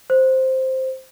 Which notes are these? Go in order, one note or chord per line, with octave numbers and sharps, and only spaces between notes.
C5